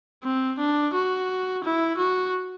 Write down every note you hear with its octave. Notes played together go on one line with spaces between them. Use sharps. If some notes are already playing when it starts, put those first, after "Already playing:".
C4
D4
F#4
E4
F#4